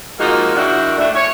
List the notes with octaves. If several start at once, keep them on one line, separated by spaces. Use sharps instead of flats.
F3 G#3 A#3 D#4 F4 F#4
D#3 D4 E4 F#4
A3 D4 E4
C#5